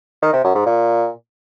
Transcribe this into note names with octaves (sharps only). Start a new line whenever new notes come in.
D#3
C3
F#2
G#2
A#2